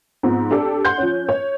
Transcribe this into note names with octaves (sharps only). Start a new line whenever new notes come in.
G#2 F3 B3 C4
D4 G4 A4 D5
F#5 C6 F#6 G6
F3 C#4
C#5